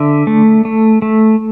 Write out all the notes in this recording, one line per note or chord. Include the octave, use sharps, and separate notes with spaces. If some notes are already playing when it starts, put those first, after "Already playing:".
Already playing: D3 E5
A3
A3
A3